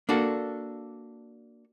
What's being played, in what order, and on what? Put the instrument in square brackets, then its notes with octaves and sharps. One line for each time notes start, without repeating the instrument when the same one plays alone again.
[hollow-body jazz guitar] A#3 D4 F#4 A4